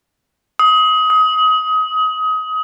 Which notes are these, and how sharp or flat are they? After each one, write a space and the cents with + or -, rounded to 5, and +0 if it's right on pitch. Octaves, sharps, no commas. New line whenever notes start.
D#6 +25
D#6 +30